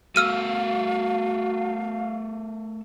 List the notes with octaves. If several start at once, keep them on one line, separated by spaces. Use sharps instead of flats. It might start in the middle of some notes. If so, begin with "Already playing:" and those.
A3 F#4 A4 A#4 F5 E6 F6 D#7